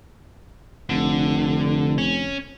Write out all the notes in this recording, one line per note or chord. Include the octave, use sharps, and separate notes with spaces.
F1 D3
C#4